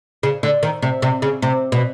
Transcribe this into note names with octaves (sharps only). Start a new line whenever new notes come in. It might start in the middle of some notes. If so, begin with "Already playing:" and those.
C#3
D3
D#3
C3
C3
C#3
C3
B2